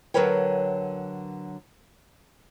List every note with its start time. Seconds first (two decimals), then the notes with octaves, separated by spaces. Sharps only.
0.14 D3 F#3 A#4 B4 C#5 G5